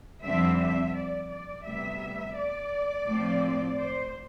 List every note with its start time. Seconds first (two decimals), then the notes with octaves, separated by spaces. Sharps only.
0.23 F2 D3 G3 C4 E5
0.58 E5
0.94 D5
1.29 D5
1.64 D2 C3 G3 B3 E5
2.35 D5
3.06 A2 F3 C4
3.78 C5